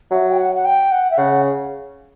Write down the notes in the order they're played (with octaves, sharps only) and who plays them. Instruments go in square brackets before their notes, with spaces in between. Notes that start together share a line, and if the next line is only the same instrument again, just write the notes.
[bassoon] F#3 [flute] E5
[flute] G5
F#5
F#5
G5
F#5
E5
[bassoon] C#3 [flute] F#5